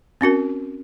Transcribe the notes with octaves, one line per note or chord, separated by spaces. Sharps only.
C4 C#4 F#4 A#4